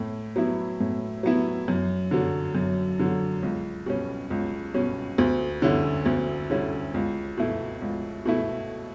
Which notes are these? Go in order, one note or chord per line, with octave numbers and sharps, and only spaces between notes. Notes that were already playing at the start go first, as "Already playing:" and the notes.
Already playing: A2
F#3 B3 E4
A2
F#3 B3 E4
F#2
D3 F#3
F#2
D3 F#3
C#2
B2 G3 C#4
C#2
B2 G3 C#4
D2
D3 G3 C#4 E4
D2
D3 G3 C#4 E4
C#2
B2 A3 E4
C#2
B2 A3 E4